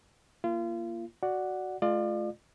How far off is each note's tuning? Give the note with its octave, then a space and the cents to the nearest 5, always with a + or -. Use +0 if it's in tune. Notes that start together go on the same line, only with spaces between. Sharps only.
A#3 +0 F4 -35
F#4 +0 D5 +0 F#5 +0
A3 -45 F4 +0 D5 +40